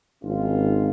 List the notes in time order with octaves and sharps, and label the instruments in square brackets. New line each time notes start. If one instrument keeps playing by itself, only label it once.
[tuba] G#1 [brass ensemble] C#4 D#4 F4